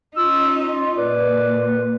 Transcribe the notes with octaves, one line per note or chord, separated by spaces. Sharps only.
C#4 D#4 F4 E6
A#2 B4 D5